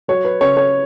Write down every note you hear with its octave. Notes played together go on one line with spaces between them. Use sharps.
F#3 C#5
B4
C#3 C#5
C#5